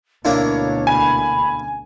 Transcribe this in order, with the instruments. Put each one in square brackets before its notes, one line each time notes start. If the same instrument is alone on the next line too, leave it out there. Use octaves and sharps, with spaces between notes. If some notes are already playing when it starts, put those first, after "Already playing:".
[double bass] D2 B2 [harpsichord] A#3 D4 E4 [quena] C#5
[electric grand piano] G#5 [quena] B5